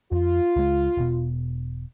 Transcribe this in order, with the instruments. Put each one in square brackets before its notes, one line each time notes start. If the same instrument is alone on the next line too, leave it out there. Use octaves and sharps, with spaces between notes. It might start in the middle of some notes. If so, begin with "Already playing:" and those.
[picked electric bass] F2 [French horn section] F4
[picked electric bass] C#2 G#3
E1 B2